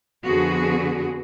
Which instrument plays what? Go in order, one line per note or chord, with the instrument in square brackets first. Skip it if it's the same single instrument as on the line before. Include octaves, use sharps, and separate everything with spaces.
[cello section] F2 D3 B3 F#4 G#4